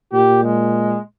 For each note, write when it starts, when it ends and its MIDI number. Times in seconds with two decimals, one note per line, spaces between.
0.13 0.97 46
0.13 0.40 67
0.44 0.99 56